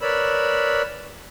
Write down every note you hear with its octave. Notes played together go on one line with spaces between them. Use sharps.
A#4 B4 C#5 D5 B5 E6